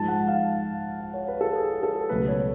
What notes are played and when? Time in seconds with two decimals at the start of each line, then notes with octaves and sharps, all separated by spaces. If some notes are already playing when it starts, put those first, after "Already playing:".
Already playing: G#2 F3 G#3 A5
0.08 F#5
0.28 F5
1.00 F#5
1.14 C#5
1.28 B4
1.41 A4
1.55 G#4
1.83 A4
2.09 C#2 B2 F#3 A3 B4
2.28 C#5